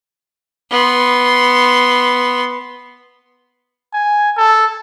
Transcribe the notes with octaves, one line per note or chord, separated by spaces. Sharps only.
B3 C6
G#5
A4